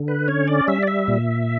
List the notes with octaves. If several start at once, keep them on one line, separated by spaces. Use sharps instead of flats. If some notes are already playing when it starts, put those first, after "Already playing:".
Already playing: D3
B4
C#4 C#5
D5
G3 E5
D5
E5
A#2